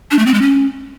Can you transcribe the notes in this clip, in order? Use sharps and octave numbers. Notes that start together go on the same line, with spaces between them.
D4
A3
C4
G#3
C#4